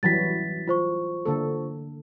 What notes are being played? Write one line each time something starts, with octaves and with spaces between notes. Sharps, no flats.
E3 F#3 G3 A6 B6
F4 C5 C#6
D3 A#3 A4